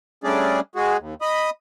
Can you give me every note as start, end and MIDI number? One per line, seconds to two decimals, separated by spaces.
0.24 0.60 55
0.24 0.60 57
0.24 0.60 61
0.24 0.60 62
0.24 0.60 68
0.24 0.60 74
0.76 0.97 56
0.76 0.97 66
0.76 0.97 68
0.98 1.14 39
1.21 1.50 75
1.21 1.50 83
1.21 1.50 87